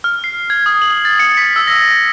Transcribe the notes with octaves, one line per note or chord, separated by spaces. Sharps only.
F6
C7
G#6
D#6
F#7
A6
C#7
B6
E6
A#6